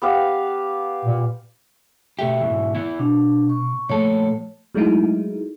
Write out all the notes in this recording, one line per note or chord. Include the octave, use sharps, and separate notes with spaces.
B3 G4 F5
A#2
B2 A3 G4 E5
G#2 B2 E3
E3 B3 E4
B2 D4
C#6
A#2 F3 A3 A4 C#5
F#3 G#3 A3 D#4 E4